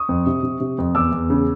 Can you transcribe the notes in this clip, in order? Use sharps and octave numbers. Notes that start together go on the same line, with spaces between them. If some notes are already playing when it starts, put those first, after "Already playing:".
Already playing: C#6 D#6
F2
C3
C3
C3
F2
E2 D6 E6
E2
C#3